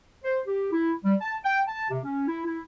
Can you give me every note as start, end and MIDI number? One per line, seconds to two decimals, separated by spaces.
0.24 0.40 72
0.46 0.71 67
0.73 0.93 64
1.04 1.15 55
1.21 1.35 81
1.44 1.61 79
1.67 1.89 81
1.90 1.99 48
2.04 2.27 61
2.28 2.43 64
2.46 2.61 64